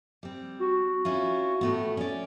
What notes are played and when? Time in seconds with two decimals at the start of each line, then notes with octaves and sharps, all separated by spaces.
0.23 G3 C4
0.60 F#4
1.05 C#4 E4 F4
1.61 A2 A3 B3
1.97 C#4 D5